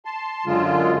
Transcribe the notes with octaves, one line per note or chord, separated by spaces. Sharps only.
A5 C6
F#2 D3 G#3 F4